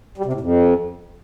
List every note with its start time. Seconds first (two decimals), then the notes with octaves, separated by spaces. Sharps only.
0.18 G3
0.25 C3
0.33 A2
0.41 F2